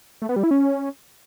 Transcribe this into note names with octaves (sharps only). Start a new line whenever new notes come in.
A3
B3
G3
E4
C#4